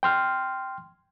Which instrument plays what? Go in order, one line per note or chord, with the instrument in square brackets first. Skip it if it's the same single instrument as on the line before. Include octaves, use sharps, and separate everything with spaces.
[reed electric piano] G5 C6 F6